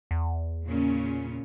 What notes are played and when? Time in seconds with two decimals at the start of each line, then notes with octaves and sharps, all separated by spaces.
0.11 E2
0.66 A#2 C#3 C#4